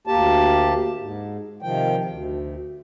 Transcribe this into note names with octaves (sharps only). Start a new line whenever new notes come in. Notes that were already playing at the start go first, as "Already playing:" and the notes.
D2 A#3 G4 A5
G#2
C3 D#3 F3 G5
D2